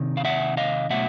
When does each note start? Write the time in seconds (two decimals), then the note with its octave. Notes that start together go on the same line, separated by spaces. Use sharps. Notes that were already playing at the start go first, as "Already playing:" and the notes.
Already playing: C3 D#3
0.17 F5
0.25 E5 F#5
0.57 D#5 F5
0.90 B2 F#3 A3 E5 F#5